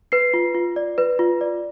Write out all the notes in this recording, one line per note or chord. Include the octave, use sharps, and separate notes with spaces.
B4 C7
F4
F4
D5
B4
F4
D5